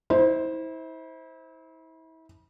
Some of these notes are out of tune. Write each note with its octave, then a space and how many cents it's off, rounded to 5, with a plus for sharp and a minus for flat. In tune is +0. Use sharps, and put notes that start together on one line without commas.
E4 -35 C5 +0